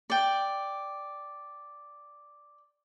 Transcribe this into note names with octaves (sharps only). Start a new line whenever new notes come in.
D5 G5